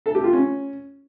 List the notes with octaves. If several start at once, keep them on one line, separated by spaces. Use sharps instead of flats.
A4
G4
F4
C#4